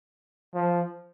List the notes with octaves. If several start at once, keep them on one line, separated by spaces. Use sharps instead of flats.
F3